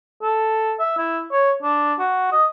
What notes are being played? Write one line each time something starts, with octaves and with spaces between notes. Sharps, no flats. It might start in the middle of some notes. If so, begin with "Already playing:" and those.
A4
E5
E4
C#5
D4
F#4
D#5